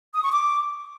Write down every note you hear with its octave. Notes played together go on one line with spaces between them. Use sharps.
D#6
C#6
D6